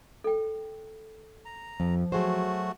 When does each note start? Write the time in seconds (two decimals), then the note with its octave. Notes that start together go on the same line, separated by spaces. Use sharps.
0.24 A4 G5
1.45 A#5
1.80 F2 F3
2.12 F#3 A3 F#4 G#4 C5